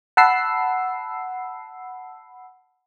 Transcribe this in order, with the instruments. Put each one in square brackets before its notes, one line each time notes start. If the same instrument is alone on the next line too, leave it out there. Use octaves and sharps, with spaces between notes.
[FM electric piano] F#5 A5 B5 E6 C7